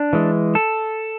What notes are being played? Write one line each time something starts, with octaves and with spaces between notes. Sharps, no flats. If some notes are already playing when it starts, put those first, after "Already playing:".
Already playing: D4
E3 G#3
A4